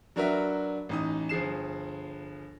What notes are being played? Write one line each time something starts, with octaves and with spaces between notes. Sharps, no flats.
F#3 D4 F#4 A#4 B4 E5
A1 D#4 D#6
G1 F3 G#4 C7 E7